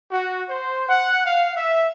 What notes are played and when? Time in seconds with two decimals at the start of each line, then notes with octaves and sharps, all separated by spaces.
0.11 F#4
0.49 C5
0.89 F#5
1.26 F5
1.56 E5